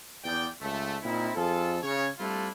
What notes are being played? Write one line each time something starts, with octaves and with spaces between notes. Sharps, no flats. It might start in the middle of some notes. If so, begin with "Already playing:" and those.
E2 D5 G5
C#2 A3
A#2 C4 D#4 E4
F2 F4 G#4 A4
C#3 C#5
G3 A3 C4 D4 E4 F4